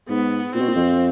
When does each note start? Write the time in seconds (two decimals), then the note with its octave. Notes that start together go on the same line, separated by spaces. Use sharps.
0.09 G#2 B3
0.54 A#2 C4
0.61 B2
0.69 A#2
0.76 F2